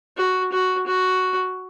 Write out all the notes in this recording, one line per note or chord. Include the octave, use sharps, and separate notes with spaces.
F#4
F#4
F#4